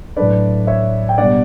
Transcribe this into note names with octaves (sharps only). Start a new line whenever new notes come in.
A2 F#3 A3 D4 B4 D5
C#5 E5
G5
B2 G3 B3 D4 D5 F#5